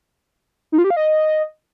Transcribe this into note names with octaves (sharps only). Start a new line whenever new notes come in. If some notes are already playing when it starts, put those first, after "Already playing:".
D#4
F4
G4
F5
D#5